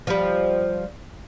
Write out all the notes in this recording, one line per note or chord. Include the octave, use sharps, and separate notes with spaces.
F3 G3